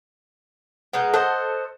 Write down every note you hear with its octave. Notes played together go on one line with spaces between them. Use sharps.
B2 G#3 D#4 F#5
A4 C5 D#5 A5 F#6